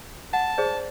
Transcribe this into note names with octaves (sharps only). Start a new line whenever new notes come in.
F#5 A5
G#4 C5 D5